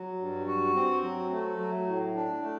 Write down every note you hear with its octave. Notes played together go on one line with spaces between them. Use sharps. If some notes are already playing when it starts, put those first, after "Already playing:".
Already playing: F#3
G2
F#4
C4
F#3
A3
F#3
A2
D4
A3